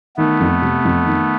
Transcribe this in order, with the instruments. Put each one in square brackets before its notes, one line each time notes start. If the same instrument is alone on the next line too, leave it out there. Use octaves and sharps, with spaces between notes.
[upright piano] D#3 [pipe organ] A3 B3
[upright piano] F2
C3
F2
D#3